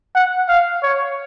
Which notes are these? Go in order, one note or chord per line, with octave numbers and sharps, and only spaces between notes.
F#5
F5
C#5